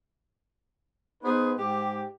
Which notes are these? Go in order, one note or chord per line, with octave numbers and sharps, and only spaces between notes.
B3 D#4 G#4 B4 C5
G#2 G4